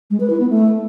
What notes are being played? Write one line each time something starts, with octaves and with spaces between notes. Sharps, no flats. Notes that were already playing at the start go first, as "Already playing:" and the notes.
G#3
B4
E4
B3
A3